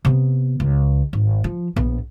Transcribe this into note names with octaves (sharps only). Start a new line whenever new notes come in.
C3 B3
C#2
G#1
F3
A#1 B3